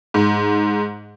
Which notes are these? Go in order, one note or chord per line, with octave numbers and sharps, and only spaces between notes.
G#2